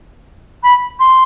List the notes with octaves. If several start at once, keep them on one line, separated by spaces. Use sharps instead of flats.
B5
C6